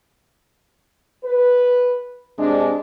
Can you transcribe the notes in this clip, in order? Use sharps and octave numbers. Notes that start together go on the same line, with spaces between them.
B4
C3 G#3 D4